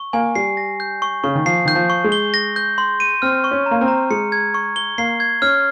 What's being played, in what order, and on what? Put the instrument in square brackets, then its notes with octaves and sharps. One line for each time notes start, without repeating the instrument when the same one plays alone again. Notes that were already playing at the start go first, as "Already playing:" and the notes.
Already playing: [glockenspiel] C#6
[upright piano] A#3 [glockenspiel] G#5
[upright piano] G3 [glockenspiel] C7
[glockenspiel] A#6
G6
C#6
[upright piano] C#3 [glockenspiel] C#6
[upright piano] D#3
[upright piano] F3 [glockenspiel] C7
[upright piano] D#3 [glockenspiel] G6
[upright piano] F3
[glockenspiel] C#6
[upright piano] G#3
[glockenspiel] G7
A#6
G6
C6
D#7
[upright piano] C4 [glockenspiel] F6
[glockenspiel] C#6
[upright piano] C#4
[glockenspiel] A#5
[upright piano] A#3
C4
[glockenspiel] A#5
[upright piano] G#3 [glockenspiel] C#7
[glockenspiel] G#6
C#6
G7
[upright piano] A#3 [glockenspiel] C7
[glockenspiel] G#6
[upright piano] C#4 [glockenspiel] F6